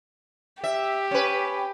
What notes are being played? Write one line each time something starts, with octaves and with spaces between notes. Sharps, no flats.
G4 E5
C#4 B4